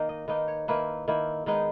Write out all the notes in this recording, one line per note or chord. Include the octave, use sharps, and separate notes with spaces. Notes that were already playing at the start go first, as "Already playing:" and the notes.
Already playing: D#3 A#3 D#4
D#5
D#3 A#3 D#4 B4
C#5
D#3 A#3 E4 B4
D#3 A#3 E4
D#3 G#3 B3 D#4 B4